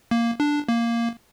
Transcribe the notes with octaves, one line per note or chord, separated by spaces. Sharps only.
A#3
D4
A#3